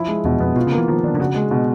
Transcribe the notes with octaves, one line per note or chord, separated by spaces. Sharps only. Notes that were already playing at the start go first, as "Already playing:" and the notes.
Already playing: F3 E4
G#3
E2 B2
F2 B3
B2 F4
C#3
A#3
E3
D#3 F3
D#3 D4
D3
C#3 F#4
G#3
B2